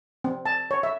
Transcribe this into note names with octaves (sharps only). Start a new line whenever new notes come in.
C4
A5
C#5
E5